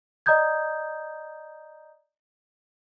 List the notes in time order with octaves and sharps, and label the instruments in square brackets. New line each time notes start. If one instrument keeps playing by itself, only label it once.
[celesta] D5 D#5 A#5 D#6 G6 G#6